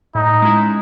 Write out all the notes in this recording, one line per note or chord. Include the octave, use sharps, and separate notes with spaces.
A2 D#4
G#3 C#4 E4